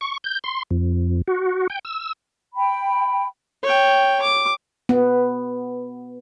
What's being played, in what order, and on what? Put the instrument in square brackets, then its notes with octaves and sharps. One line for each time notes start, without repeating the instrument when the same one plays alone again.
[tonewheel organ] C#6
G6
C6
F2
F#4
G5
E6
[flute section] G5 B5
[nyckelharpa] C#5 G5
D6
[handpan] B3